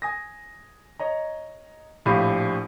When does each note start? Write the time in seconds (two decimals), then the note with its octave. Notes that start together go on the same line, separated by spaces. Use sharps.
0.02 G#5 D#6 A#6
1.00 C#5 D#5 A#5
2.05 A#1 A2 G4 F5 B5 D#7